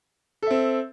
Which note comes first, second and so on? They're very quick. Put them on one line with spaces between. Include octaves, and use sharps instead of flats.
A4 E5 C4